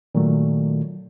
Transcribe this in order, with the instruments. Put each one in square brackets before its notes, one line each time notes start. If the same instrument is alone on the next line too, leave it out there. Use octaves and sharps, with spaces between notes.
[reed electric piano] A#2 D#3 F#3 A3